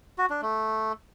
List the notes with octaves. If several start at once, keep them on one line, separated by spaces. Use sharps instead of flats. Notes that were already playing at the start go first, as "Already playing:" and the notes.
F#4
D4
A3